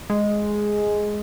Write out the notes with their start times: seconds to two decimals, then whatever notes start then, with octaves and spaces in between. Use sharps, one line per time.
0.10 G#3